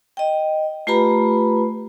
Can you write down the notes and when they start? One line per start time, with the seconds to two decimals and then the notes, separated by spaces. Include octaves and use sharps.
0.17 D#5 G5
0.87 A3 F4 G4 B4 A#5 B5